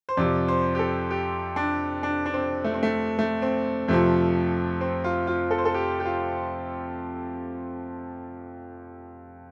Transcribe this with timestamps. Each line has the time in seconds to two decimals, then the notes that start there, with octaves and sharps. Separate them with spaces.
0.09 C5
0.17 F2 C3 F3 D5
0.48 C5
0.75 G4
0.79 A4
1.10 G4
1.56 D4
2.03 D4
2.26 D4
2.34 C4
2.64 A3
2.74 C4
2.83 A3
3.19 A3
3.42 C4
3.88 F2 C3 F3 A3
4.81 C4
5.04 F4
5.27 F4
5.51 A4
5.58 C5
5.65 A4
5.74 G4
6.00 G4
6.05 F4